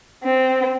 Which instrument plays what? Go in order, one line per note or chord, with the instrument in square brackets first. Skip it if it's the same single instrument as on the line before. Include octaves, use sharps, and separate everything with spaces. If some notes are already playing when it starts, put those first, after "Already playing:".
[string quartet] C4